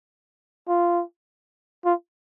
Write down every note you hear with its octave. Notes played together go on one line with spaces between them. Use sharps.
F4
F4